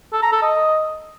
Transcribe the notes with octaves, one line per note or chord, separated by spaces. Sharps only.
A4
A#5
A4
D#5